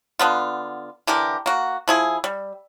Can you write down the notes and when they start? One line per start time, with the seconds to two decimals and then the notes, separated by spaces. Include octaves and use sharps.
0.19 D3 B3 F4
1.07 D3 E3 G4 A#4
1.46 A#3 F#4
1.88 F3 E4 G#4
2.24 G3